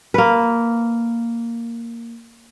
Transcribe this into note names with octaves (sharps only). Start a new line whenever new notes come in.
A#3 B4